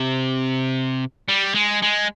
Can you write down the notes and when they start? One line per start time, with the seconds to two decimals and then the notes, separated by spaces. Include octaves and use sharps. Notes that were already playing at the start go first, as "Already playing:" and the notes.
Already playing: C3
1.28 G3
1.55 G#3
1.82 G#3